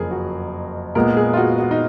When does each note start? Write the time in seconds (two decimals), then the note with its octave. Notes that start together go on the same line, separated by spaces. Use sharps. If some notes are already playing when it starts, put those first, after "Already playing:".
Already playing: F#1 F2 G#4 A#4
0.11 F#4
0.95 A#2 G#3 B3 A#4
1.17 G#4
1.33 F4
1.37 F#4
1.59 F#4
1.71 D#4